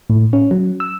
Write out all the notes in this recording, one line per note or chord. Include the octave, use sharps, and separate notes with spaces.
A2
C#4
F#3
E6